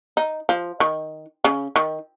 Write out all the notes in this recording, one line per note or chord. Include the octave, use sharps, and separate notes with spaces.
D#4
F3
D#3
C#3
D#3